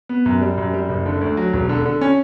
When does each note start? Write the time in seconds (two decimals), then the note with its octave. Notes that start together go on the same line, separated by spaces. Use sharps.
0.09 B3
0.26 F#2
0.41 G3
0.58 F#2
0.74 G3
0.89 F#1
1.06 D3
1.21 D2
1.37 F#3
1.54 E1
1.69 D3
1.85 D3
2.01 C#4